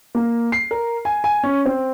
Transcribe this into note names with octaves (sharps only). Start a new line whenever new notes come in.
A#3
C7
A#4
G#5
G#5
C#4
C4